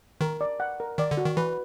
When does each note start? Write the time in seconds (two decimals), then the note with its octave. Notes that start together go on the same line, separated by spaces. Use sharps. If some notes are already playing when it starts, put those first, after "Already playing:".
0.21 D#3 A#4
0.41 D5
0.60 F#5
0.80 A#4
0.98 D#3 D5
1.11 D3
1.18 F#4
1.25 D#3
1.37 E3 B4